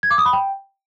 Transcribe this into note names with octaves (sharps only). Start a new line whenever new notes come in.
G#6
D6
D#6
B5
G5